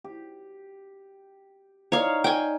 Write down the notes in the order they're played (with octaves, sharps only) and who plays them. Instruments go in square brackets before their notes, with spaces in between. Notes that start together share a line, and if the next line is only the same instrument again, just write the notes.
[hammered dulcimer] G4
[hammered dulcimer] D#4 D5 [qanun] C#5 F5
[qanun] G5 G#5